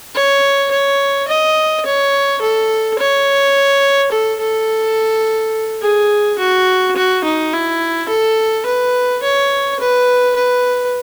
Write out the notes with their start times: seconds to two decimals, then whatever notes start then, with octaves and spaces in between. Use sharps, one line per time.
0.15 C#5
0.71 C#5
1.28 D#5
1.85 C#5
2.41 A4
2.99 C#5
4.12 A4
4.40 A4
5.82 G#4
6.39 F#4
6.96 F#4
7.24 D#4
7.53 E4
8.09 A4
8.66 B4
9.22 C#5
9.80 B4
10.36 B4